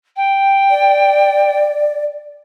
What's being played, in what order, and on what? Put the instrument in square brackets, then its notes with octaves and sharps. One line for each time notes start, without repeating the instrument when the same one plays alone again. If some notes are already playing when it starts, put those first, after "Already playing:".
[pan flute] G5
[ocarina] D5